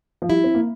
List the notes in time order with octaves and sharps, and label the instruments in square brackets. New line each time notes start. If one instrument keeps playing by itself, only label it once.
[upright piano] F3
[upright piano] G3 [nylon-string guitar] E4
[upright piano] C4
A#3